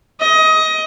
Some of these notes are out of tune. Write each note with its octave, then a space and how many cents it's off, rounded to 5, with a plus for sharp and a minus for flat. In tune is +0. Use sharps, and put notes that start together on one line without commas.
D#5 +20